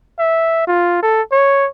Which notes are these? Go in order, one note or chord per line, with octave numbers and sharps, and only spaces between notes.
E5
F4
A4
C#5